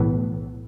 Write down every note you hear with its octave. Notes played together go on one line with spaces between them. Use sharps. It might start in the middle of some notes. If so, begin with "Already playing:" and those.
Already playing: B1 A2 E3 B3